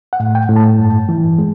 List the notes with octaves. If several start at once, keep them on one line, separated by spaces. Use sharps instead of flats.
F#5
A2
G5
A2
A5
G2
E3
G#3